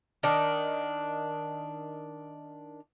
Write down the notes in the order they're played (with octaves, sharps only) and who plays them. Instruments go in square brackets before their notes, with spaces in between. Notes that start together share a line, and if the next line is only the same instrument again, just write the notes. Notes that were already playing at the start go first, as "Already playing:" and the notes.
[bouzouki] D#3 D4